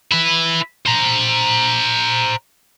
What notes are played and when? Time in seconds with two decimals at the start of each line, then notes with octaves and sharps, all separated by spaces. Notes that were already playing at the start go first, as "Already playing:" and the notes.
0.11 E4 B4
0.86 C5 A#5